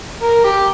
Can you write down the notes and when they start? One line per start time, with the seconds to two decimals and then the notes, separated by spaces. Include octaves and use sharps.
0.22 A#4
0.44 G4